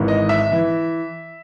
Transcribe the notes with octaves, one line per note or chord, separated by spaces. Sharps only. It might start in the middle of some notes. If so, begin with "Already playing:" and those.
Already playing: G#1 G#2 E3
D#5
E5
E3